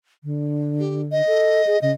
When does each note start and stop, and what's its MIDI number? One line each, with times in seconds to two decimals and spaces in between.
0.24 1.22 50
0.79 1.01 67
1.12 1.82 75
1.27 1.62 69
1.67 1.77 68
1.82 1.92 49
1.82 1.92 75